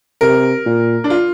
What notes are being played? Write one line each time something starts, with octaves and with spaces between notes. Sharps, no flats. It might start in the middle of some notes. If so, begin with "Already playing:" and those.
C3 A#4
A#2
D4
F4